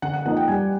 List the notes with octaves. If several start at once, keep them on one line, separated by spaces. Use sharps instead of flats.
D3 F#5
F#5
F3 A#3 D#4 F#5
G5
G3 G#5